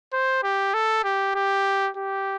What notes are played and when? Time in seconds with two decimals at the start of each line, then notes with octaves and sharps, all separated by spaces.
0.13 C5
0.43 G4
0.74 A4
1.04 G4
1.35 G4
1.96 G4